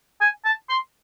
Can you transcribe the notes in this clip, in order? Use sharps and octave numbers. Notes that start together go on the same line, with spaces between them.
G#5
A5
C6